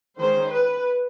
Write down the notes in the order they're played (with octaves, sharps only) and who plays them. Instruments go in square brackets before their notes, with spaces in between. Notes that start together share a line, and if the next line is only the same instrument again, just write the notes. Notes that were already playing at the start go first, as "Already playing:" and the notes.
[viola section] D#3 G#3 C#4 C5
B4